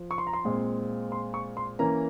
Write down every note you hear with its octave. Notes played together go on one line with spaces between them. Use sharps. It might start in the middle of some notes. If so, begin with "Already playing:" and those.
Already playing: F3
C#6
C6
A#5
C6
A#2 G#3 C4
C6
C#6
C6
E3 A#3 C#4 A#5